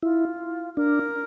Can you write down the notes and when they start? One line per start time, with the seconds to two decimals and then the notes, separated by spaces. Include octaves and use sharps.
0.03 E4 F4
0.77 D4 A#4